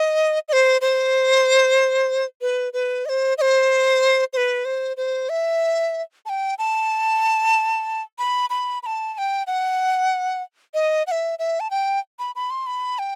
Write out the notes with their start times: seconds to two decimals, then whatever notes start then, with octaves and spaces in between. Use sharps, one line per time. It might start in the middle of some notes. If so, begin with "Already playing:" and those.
Already playing: D#5
0.49 D#5
0.53 C5
0.81 C5
2.41 B4
2.73 B4
3.06 D#5
3.09 C5
3.38 D#5
3.41 C5
4.33 C5
4.37 B4
4.65 C5
4.97 C5
5.29 E5
6.26 A5
6.29 G5
6.58 A5
8.19 B5
8.50 B5
8.83 B5
8.86 A5
9.14 A5
9.18 G5
9.47 F#5
10.74 D#5
11.07 F#5
11.11 E5
11.39 E5
11.60 A5
11.71 G5
12.19 B5
12.36 B5
12.50 C6
12.66 B5
12.99 G5